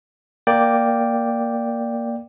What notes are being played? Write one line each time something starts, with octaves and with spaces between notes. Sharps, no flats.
A#3 D5 G5